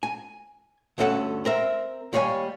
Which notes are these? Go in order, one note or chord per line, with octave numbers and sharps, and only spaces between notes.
G#5
D2 G2 C#4 A4 F#5
C4 A#4 E5
D#2 G3 C#5 F5 G#5